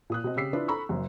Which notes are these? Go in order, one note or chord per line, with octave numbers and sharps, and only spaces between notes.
A#2 D#6 F#6
B2 C4 D#5
C#3 G4 E6 B6 C7
D4 E4 F4 B4
A4 A#5 B5 C#6 E6
F#1 F#2